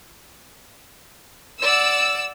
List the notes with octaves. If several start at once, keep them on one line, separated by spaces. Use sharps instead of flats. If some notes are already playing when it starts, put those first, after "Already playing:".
D5 F#5 E6